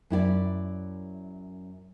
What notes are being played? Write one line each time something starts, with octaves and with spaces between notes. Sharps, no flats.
F#2 E4 F#4 D5